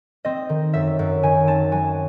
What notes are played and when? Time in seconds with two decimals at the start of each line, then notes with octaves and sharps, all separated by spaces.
0.25 C4 D#5
0.49 D#3
0.73 F#2 E5
0.99 F#2
1.23 D#3 G#5
1.47 C4 A5
1.72 F#3 G#5